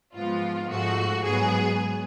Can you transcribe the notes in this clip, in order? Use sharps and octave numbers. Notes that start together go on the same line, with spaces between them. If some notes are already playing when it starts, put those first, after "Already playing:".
G#2 F3 B3 F4
G#2 F3 A3 F#4
G#2 F#3 B3 G#4